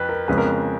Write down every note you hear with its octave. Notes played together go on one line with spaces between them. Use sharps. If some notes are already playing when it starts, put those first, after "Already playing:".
Already playing: F2 B4
A#4
F2 C#3 G#3 B3 B4
A#4
B4